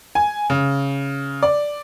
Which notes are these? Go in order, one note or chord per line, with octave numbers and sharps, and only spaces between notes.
G#5
C#3
D5